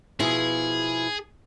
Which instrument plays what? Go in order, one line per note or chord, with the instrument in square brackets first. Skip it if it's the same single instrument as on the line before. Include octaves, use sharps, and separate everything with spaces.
[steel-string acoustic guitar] B2 F3 E4 [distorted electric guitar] G#4